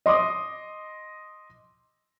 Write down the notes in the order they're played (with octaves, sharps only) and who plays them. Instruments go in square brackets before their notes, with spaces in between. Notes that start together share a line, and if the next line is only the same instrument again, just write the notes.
[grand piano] D#5 C6 D6 D#6